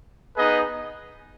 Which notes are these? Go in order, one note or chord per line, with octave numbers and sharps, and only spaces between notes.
B3 D#4 G#4 B4 D#5